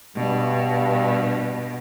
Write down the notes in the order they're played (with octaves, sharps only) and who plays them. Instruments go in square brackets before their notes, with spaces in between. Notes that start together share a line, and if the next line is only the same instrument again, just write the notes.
[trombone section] G2 [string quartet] B2